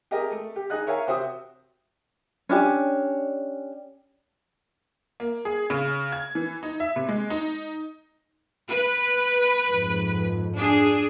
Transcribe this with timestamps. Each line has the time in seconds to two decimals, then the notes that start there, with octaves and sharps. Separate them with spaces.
0.11 G4 G#4 A#4 D#5
0.32 A3
0.56 G4
0.70 D#4 G#4 D#5 F#6
0.87 A#4 C#5 E5 F5 G#5
1.07 C3 F#4 C5 E5 D#6
2.49 C#4 D4 G4 G#5
5.20 A#3
5.45 G#4
5.70 C#3
6.12 G#6
6.35 E3
6.63 D#4
6.80 E5
6.96 C3
7.09 G#3
7.30 D#4
8.69 B4
9.68 F2 G#2
10.56 D4 G#4